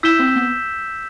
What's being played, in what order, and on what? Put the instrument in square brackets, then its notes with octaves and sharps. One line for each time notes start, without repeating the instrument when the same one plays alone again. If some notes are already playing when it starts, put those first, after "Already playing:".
[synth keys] E4 [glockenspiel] E6 G6 B6 E7 G7
[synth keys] C4
B3